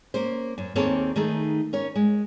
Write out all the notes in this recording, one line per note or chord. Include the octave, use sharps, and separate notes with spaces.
A#3 C#4 C5
F#2
D#2 A#3 C4 G#4 A4 C#5
D#3 A3 D#4 G#4
C#4 A#4 C#5
G#3